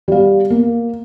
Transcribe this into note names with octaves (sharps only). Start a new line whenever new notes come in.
G3 F5
A#3